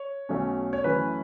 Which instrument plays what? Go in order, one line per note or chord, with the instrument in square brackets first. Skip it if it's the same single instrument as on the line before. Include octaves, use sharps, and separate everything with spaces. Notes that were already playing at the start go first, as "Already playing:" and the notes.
Already playing: [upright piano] C#5
B1 B2 A3 C#4
C#5
F#2 E3 A3 C#4 B4